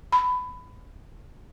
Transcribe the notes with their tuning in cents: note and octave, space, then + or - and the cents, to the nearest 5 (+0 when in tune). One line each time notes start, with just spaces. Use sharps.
B5 +20